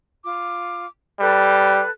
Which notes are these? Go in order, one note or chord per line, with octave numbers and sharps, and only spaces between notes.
F4 D6
G3 A4 B4 F#6